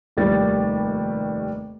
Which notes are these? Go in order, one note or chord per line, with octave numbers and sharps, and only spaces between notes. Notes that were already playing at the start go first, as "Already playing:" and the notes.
F1 D#2 G3 A6